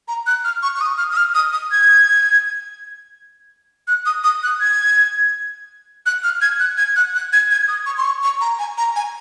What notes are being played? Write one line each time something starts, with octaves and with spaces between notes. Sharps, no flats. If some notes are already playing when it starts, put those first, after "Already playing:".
A#5
F#6
F6
C#6
C#6
D#6
F6
D#6
F6
D#6
D#6
G#6
F#6
D#6
D#6
F#6
G#6
F#6
F6
G#6
F#6
G#6
F#6
F#6
G#6
G#6
D#6
C#6
C6
C#6
C#6
A#5
G#5
A#5
G#5